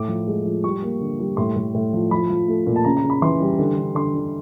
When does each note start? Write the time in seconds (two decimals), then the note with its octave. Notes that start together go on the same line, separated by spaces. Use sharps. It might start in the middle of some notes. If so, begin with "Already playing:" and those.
Already playing: A2 D6
0.08 F3
0.27 G#3
0.45 F3
0.64 G3 C#6
0.82 A#3
1.01 D3
1.20 G3
1.37 A2 C6
1.56 A2
1.74 A2
1.93 F3
2.11 F3 B5
2.30 F3
2.48 A3
2.67 A#2
2.76 A5
2.84 C#3 A#5
2.97 A#5
3.04 C#3
3.10 B5
3.22 E3 C6
3.40 G3
3.59 D3
3.76 D3
3.95 D3 C6
4.14 D3